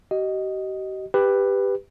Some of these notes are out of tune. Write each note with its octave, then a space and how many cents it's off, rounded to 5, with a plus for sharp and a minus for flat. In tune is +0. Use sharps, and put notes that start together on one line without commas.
G4 -45 D#5 +0
G4 +10 B4 +5